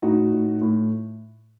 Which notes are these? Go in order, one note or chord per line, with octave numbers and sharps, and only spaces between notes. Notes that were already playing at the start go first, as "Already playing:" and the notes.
A2 D#4 F#4
A2
A2